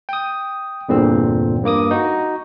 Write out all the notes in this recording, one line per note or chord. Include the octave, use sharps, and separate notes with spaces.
G5 D#6
E2 G2 A#2 D3 C4
G2 A#3 D6 D#6
D#4 F#4